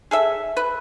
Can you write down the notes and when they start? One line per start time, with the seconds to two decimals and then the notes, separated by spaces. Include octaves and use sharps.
0.11 G#4 A4 E5
0.57 B4